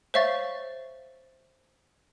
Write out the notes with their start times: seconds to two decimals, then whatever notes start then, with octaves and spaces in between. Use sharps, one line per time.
0.14 C5 C#5 E5 F5 C#6 A6